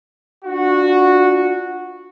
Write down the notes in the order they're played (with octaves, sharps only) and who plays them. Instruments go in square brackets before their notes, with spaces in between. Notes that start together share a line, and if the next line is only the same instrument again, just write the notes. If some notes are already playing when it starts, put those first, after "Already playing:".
[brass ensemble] D4 F4 F#4